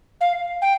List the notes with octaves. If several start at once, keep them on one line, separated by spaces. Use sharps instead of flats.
F5
G5